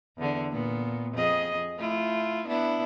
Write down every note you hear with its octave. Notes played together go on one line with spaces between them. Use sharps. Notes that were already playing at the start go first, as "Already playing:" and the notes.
E2 D3
A#2 B3
F2 G#4 D#5
A3 E4 F4
B3 D4 E4